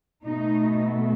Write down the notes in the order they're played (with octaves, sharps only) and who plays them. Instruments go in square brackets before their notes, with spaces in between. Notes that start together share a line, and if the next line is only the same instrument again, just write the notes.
[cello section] B2 A3 D#4